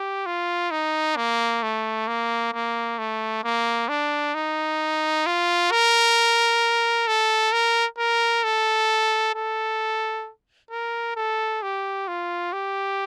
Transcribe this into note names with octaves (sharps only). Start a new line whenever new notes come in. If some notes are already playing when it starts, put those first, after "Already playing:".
Already playing: G4
F4
D#4
A#3
A3
A#3
A#3
A3
A#3
D4
D#4
F4
A#4
A4
A#4
A#4
A4
A4
A#4
A4
G4
F4
G4